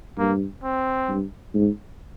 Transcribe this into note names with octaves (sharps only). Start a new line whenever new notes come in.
G2 A#3
C4
G2
G#2